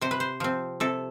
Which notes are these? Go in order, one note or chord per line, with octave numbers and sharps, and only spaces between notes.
C3 C5
B4
C5
F3 C4
C3 A4